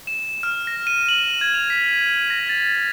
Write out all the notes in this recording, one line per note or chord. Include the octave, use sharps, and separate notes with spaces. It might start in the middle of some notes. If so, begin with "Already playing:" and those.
E7
F6
A#6
D#7
F#7
G#6
F7
B6
A#6
A6